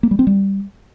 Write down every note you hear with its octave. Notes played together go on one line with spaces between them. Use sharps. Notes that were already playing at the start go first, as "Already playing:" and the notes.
A#3
G3
C4
G3